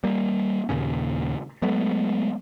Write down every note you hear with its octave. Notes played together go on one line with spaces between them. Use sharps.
G3 A#3
D#2 A#2 C#3 C#4
F#3 G#3 A3 B3